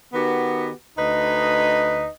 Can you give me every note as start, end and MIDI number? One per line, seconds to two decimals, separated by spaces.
0.13 0.70 51
0.13 0.70 59
0.13 0.70 66
0.13 0.70 67
0.13 0.70 71
0.96 2.08 38
0.96 2.08 63
0.96 2.08 71
0.96 2.08 75